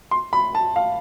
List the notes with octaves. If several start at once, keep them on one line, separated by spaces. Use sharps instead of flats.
C6
B5
A5
F5